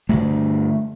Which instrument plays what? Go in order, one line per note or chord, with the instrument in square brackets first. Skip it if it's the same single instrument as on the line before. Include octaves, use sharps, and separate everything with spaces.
[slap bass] G2 D3 A3